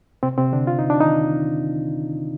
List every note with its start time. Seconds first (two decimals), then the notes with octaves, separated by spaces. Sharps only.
0.23 C3 C4
0.38 C3 C4
0.53 D3 D4
0.67 F4
0.79 D#4
0.90 D4
1.00 D#3 D#4